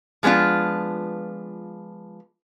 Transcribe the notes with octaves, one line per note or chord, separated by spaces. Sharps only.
F3 G#3 B3 D4 F4